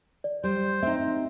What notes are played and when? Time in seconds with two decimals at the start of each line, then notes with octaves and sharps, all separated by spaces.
0.24 D5
0.44 G3 C5
0.83 C4 D#4 E5